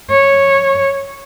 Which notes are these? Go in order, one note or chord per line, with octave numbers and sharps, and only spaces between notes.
C#5